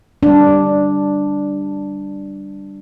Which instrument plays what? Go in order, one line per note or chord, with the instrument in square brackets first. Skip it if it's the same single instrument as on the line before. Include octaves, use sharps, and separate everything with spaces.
[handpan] G3 D4